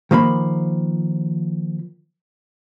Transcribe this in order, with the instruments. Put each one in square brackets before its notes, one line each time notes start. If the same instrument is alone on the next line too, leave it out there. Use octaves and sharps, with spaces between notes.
[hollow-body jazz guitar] D#3 F3 A#3 B5